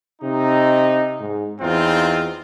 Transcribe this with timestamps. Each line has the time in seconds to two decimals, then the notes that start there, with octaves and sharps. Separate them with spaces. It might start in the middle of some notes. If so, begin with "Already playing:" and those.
0.22 C3 D#4
1.20 G#2
1.61 E2 C4 D#4 F4